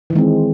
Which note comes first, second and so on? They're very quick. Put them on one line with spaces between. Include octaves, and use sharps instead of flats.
E3 D#3 G#3 C4